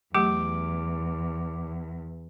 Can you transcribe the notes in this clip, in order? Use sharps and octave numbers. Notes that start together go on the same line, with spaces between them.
E2 F#3 A3 G4 D6